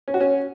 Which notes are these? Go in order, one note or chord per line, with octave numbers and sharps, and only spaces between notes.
C#4
F#4
C#4